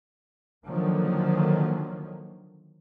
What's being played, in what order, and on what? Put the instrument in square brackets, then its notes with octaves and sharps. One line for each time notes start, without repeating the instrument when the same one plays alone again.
[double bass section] D3 D#3 F3 F#3 A#3